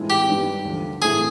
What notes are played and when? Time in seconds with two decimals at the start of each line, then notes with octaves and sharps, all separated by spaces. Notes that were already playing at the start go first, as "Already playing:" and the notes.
Already playing: A2 E3 G#3 C4 F4
0.10 G4
0.28 G2 D#3 G3 B3
0.65 D2 D3 F3
1.02 A2 E3 A3 C4 G#4